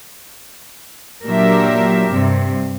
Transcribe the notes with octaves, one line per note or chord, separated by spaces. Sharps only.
A#2 F#3 D4 G4 A#4 E5
G2 C3